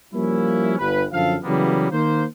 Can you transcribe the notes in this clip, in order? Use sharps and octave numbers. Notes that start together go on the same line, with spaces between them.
F3 G3 A#3 C#4 E4
G1 B4
F#2 D3 F3 A4 F5
C#3 E3 F#3 G3 A#3 B3
D#3 A#3 C5